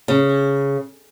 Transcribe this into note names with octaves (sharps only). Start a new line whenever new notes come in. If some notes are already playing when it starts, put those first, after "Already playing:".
C#3